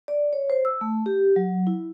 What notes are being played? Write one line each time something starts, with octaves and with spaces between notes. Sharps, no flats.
D5
C#5
C5
E6
A3
G4
F#3
E4